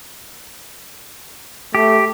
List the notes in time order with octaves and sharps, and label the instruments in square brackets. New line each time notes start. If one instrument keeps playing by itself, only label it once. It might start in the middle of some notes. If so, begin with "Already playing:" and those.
[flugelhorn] A3 [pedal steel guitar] G4